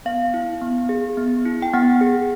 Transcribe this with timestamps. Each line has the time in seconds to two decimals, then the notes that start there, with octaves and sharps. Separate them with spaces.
0.05 B3 F5
0.34 E4
0.62 B3
0.89 G#4
1.17 B3
1.46 E4
1.62 G5
1.73 B3 F#5
2.01 G#4